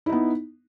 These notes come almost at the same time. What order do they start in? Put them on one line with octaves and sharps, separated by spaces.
E4 D#4 B3